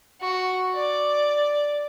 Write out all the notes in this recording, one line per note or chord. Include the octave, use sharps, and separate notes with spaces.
F#4
D5